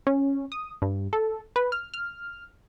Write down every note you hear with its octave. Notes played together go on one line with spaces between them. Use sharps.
C#4
D#6
G2
A4
B4
F6
F6